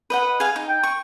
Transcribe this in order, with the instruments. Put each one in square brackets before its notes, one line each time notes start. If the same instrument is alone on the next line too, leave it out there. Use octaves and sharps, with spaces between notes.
[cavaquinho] B4 D#5 F#5
G#4 F5
D#4
[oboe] G5
[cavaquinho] C#6